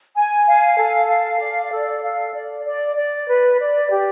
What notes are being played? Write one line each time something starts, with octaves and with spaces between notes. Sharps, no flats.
G#5
F5
A4
F5
D5
A4
F5
D5
D5
D5
B4
D5
G4